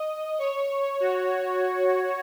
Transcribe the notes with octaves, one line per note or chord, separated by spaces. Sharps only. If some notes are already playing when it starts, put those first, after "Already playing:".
Already playing: D#5
C#5
F#4